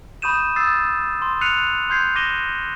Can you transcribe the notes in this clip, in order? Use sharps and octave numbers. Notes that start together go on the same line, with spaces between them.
B5 C#6 D#6 G6 D#7 E7
D#6 E6 A6 C7
C6
F6 F#6 C7 C#7 D#7 F7
C6 G6 G#6 C7
D6 A#6 D#7 E7 G7